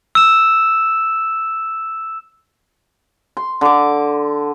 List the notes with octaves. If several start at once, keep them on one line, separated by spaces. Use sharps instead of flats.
E6 E7
C6
D3 D6